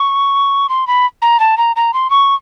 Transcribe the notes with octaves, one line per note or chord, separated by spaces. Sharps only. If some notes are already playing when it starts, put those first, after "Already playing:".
Already playing: C#6
C6
B5
A#5
A5
A#5
A#5
C6
C#6